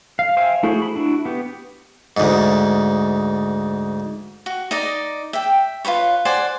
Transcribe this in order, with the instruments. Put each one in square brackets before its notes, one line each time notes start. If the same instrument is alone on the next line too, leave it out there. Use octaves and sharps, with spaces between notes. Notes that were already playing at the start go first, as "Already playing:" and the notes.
[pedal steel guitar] F5
C5 E5 F5 G5 G#5
A3 E4 F#4 G#4 C5
B5
D4 E4 F#4
B3 G4
[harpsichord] D2 G#2
[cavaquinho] F#4
D#4 D5 D#5
E5 G5
F4 G#4 B4 C#5
C5 D5 F#5 G#5